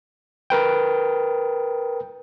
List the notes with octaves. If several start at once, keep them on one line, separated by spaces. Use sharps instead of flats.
A#4 B4 G5